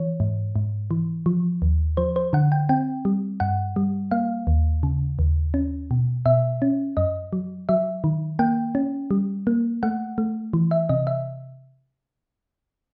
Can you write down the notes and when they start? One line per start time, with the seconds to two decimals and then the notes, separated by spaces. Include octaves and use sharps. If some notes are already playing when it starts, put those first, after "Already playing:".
Already playing: E3 C#5
0.20 G#2
0.56 G#2
0.91 E3
1.26 F3
1.62 D#2
1.97 F3 C5
2.16 C5
2.33 D3 F#5
2.52 G5
2.69 C4 G5
3.05 G3
3.40 G2 F#5
3.76 G3
4.11 A#3 F5
4.47 D#2
4.83 C#3
5.19 D#2
5.54 C#4
5.91 B2
6.26 B2 E5
6.62 C#4
6.97 F#2 D#5
7.33 F#3
7.69 F#3 E5
8.04 D#3
8.39 A#3 G5
8.75 C#4
9.11 G3
9.47 A#3
9.83 A3 F#5
10.18 A3
10.53 E3
10.71 E5
10.89 C3 D#5
11.07 E5